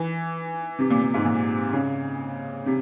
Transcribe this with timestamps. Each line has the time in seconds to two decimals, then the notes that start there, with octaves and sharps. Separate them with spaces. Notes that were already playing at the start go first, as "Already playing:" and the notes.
Already playing: E3
0.79 C3
0.90 A#2
1.03 A#2
1.14 G#2
1.25 A#2
1.73 C#3
2.66 C3